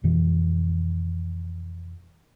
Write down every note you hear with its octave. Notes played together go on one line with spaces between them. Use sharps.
F2 B2 E3